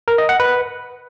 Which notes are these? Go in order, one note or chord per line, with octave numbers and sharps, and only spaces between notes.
A#4
D#5
F#5
B4